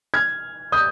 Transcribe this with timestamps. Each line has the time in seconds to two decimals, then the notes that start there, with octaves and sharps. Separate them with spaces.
0.14 F6 G#6
0.72 D#6 G6